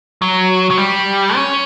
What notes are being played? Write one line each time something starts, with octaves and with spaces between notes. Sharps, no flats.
F#3
F#3
G3
C#4